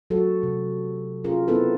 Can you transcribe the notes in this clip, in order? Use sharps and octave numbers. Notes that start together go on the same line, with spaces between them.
F#3 F#4 A4
C3
C#4 F4 G#4 A#4
B3 C4 E4 A4 B4